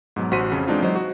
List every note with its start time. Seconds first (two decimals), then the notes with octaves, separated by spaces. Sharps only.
0.16 G#2 B2 F#3
0.31 A1 F#4 C5 C6 B6 D#7
0.52 F2 C#3
0.67 E3 G#3 C4 D4 D#4 F4
0.82 F#3 G#3 C5 D#5
0.96 F#4